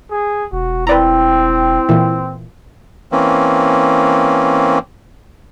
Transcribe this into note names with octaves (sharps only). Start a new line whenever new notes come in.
G#4
E1 F#4
C4 E4 B4 D5 G5 A#5
A#2 E3
E3 A#3 C4 C#4